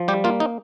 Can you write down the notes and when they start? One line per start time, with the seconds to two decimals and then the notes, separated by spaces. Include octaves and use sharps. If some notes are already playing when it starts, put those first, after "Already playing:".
Already playing: F3
0.08 G3 G4
0.24 A#3 F4
0.40 D#4